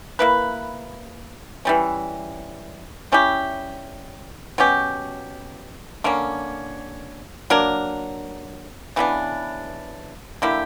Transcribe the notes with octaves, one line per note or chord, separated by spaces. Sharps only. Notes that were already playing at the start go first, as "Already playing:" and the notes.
A#3 E4 B4
E3 G3 C#4
G3 C#4 E4 G4
B2 F#3 C#4 G4
D3 A#3 C#4
F#3 A#3 D4 A#4
C#3 E3 B3 D4
D3 A#3 E4 G4